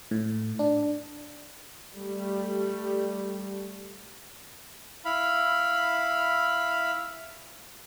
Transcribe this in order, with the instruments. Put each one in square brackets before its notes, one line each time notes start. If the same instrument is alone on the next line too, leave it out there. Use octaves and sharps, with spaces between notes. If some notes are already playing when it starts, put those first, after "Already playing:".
[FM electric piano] A2
D4
[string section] G3 A3
[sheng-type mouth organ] E4 F5 B5